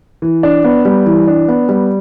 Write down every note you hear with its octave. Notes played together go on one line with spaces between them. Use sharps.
E3
D4
B3
G3
E3
D4
B3
G3